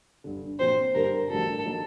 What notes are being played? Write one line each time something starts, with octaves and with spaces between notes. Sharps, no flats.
G1 G2 D3
A#2 F#3 C4 C5
G2 D3 G3 D4 A#4
A1 A2 G3 D4 F#4 A4
F#3 A#3 D#4